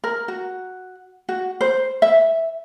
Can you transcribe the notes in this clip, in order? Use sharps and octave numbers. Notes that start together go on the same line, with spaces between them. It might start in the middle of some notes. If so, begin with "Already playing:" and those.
A#4
F#4
F#4
C5
E5